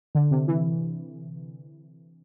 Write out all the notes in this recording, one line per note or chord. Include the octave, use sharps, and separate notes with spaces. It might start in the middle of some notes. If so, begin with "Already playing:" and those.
D3
C3
E3